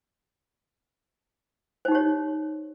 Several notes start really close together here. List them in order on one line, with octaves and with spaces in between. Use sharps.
C5 D#4 G4 C#5